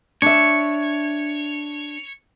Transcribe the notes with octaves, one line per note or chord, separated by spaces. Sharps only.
D4 C#5 E5